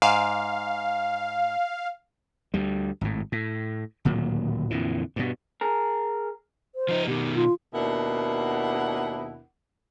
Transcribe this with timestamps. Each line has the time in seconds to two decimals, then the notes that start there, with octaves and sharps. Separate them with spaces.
0.02 G#2 F5
2.54 D2 G3
3.01 G#1 A2
3.32 A2
4.05 D1 A#2 D#3 F#3
4.70 F2 A#2 D3 E3
5.16 G2 B2
5.61 G#4 A#4
6.75 C5
6.89 F3 D#4
7.07 B2 D#3 G4
7.35 F4
7.74 D#2 B2 D4 E4 A#4 F#5